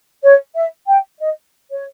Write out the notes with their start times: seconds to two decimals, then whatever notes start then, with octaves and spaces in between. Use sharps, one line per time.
0.23 C#5
0.55 E5
0.87 G5
1.20 D#5
1.72 C#5